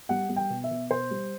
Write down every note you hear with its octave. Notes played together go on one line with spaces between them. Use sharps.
G3 F#5
G3
G5
B2
E5
B2
B2 C5
G3